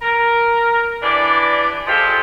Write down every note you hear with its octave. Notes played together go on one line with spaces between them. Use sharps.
A#4
E3 D4 G4 D5
F3 G#3 F4 G4 A4